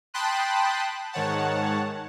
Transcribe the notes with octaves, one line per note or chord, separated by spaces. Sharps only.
G5 A5 B5 C6 D#6 F#6
G#2 D#3 C#5 F#5 A5